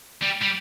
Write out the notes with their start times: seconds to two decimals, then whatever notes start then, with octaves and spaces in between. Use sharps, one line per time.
0.23 G3
0.42 G3